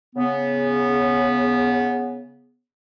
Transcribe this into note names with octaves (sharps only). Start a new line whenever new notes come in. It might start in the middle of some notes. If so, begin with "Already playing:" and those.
C#3 B3